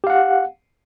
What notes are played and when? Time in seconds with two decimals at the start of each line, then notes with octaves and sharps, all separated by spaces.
0.04 G4
0.07 F5
0.10 F#5